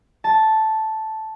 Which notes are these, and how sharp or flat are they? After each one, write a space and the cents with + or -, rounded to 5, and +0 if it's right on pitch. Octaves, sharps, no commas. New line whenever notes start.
A5 -5